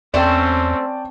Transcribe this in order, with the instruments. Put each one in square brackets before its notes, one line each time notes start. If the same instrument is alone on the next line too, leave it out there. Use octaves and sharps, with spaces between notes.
[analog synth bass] E2 [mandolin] A3 C5 [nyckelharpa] C4 C#4 [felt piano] D5 G5 A5